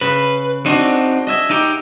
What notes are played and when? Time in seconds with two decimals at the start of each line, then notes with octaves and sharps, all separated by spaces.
0.01 C#3 B4 B5
0.66 C4 D4 D#4 F#4
1.27 D#5 E5 G#5
1.51 D#4 G4